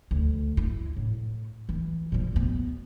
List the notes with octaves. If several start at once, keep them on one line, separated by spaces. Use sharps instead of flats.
D2
E4
A2
E3
A#2 F3
B2 B3